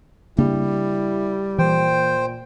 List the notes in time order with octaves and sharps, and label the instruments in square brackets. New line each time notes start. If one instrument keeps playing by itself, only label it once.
[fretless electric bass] C#3 A#3 D4 [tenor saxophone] G3 [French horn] E4
[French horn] A#2 [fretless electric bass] E3 [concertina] C5 G5